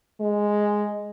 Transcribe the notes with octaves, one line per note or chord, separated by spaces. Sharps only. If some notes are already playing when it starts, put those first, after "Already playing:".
G#3